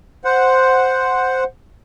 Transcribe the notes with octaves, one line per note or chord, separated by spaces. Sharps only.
C5 F#5